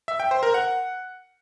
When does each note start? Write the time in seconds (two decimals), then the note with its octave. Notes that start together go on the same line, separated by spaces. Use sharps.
0.08 E5
0.20 G5
0.31 C5
0.43 A#4
0.54 F#5